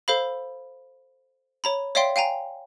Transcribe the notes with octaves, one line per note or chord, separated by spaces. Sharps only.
A4 C5 F5 B5
C#5 A#5 B5
C#5 D5 E5 F5 G5 C6
F5 G5 G#5 A#5